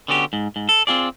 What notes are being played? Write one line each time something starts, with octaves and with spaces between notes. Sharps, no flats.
D3 B3 C#4 F#4 G4
G#2
G#2
A4
C4 C#4 F4 G#4 D5